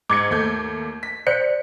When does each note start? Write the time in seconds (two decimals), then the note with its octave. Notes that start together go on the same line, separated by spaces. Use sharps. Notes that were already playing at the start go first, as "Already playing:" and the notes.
0.10 G#2 D6 G#6 C#7
0.31 D#2 A3 G6
1.03 B6
1.27 C5 D5 C#7